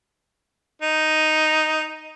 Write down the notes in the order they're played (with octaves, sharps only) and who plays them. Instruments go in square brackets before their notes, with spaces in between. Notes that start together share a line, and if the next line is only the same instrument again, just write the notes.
[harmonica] D#4